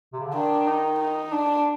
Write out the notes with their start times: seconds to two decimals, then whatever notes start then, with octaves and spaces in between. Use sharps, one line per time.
0.13 C3
0.20 C#3
0.26 D3
0.33 D#3 D4
0.67 D#4
0.99 D#4
1.32 D4